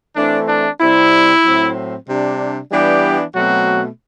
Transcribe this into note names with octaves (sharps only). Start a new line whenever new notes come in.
E3 A3 C4 D4
D4
C3 G3 C4 E4
A2 F#3 C4
C3 G3 D4
E3 G3 B3 D4 G4
B2 F#3 A3 C4 F#4